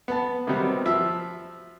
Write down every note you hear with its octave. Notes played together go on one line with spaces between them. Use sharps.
B3 A5
C3 D#3 F#3 G3 B3 C4
F3 E5